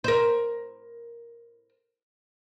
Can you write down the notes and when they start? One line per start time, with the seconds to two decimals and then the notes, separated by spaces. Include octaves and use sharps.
0.04 A#4 C5